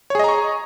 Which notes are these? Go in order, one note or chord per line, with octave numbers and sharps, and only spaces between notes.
G#4 C#5 D#5 A#5 C#6